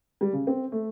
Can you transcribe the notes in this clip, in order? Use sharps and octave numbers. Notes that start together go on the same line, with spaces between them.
G3
C#3
C4
A3